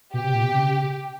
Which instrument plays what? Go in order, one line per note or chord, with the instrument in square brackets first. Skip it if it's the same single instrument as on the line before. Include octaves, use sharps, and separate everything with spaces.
[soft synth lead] B2 [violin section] G4
[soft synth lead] C3
A#2
B2
C#3